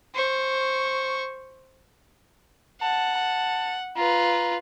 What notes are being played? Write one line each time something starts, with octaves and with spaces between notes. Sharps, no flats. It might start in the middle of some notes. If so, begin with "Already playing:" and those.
C5 C#6
F#5 A5
A5
F4 B4 A#5